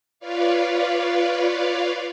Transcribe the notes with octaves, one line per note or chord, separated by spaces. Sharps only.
F4 B4 C#5 D5 F5